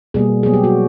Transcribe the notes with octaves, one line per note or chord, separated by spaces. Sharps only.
B2 G3 A#3 G#4
B2 F#3 B3 G#4
G4
F#4